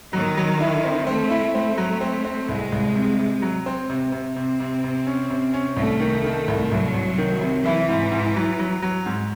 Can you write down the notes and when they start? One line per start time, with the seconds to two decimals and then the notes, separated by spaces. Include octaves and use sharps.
0.13 D#3 F#3
0.37 F#3
0.61 E4
0.84 C4
1.07 A3 C4
1.30 E4
1.54 A3 C4
1.78 F#3
2.01 C4
2.24 C4
2.48 C2 G#3
2.72 C2
2.95 C3
3.19 C3
3.42 F#3
3.66 C4
3.90 C3
4.12 C3
4.36 C3 C4
4.60 C3
4.84 C3
5.07 C#4
5.30 C3
5.54 C#4
5.77 C2 A3
6.01 D#3
6.24 D#3
6.48 C2
6.71 C2 F#3
6.94 C2
7.18 D#3
7.41 C3
7.64 E3 E4
7.89 G#2
8.11 G#2
8.36 F#3
8.59 F#3
8.82 F#3
9.06 G#2